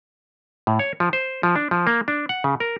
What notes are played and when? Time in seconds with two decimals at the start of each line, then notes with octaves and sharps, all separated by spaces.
0.67 A2
0.79 C#5
1.00 F3
1.13 C5
1.43 F3
1.56 D4
1.71 F3
1.87 A#3
2.08 D4
2.29 F#5
2.44 C#3
2.60 A#4